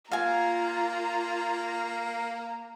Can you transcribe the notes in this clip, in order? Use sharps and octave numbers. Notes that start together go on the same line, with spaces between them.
A#3 F4 F5 G#5 A#5